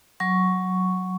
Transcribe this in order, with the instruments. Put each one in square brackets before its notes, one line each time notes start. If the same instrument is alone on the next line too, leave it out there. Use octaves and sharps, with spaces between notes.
[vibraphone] F#3 C#6